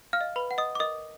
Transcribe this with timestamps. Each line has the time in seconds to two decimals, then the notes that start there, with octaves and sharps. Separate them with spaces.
0.13 F5 F6
0.21 D#5
0.36 B4 B5
0.51 F#5
0.58 D#5 D#6
0.75 D6
0.80 A#4 D#5 D#6